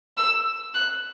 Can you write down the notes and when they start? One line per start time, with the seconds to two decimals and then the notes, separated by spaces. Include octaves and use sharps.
0.17 E6
0.74 F#6